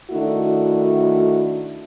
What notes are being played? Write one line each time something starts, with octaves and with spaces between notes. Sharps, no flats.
D#3 A3 D4 E4 F#4